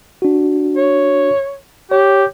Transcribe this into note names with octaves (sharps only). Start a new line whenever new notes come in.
D4 F#4
C#5
G4 C#5